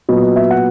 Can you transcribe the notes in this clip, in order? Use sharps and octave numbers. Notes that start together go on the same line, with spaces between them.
A#2 F#3 B3 D#5
D#5
E5
F#5